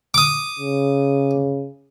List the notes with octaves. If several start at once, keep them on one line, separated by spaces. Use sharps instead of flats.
D6 D#6
C#3